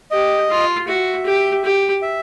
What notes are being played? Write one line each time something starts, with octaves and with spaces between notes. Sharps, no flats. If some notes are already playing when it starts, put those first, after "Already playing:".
G4 D#5
F4
F#4 E5
G4
G4
E5